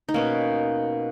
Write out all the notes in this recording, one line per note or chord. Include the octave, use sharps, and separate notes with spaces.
D#4
B2 A#3 C#4